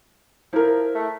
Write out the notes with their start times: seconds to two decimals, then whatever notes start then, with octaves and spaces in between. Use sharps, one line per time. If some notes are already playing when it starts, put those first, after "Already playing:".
0.53 F3 E4 A#4
0.95 A3